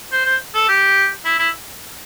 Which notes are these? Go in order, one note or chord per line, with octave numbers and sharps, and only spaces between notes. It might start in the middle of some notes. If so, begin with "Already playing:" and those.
C5
C5
A4
G4
E4
E4